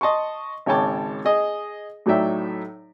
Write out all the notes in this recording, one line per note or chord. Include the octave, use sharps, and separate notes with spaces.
D#5 A5 C6 C#6
G#1 C#3 C#5 G5 A5 D6
G#4 D#5
A2 F#3 D#4 D5 E5 G5